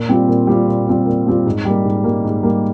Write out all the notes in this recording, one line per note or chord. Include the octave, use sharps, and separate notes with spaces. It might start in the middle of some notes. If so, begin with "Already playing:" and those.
Already playing: A#2
G3 C4 F4
A#2
G3 C4 F4
A#2
G3 C4 F4
A#2
G3 C4 F4
G#2
G3 A#3
G#2
G3 A#3
G#2
G3 A#3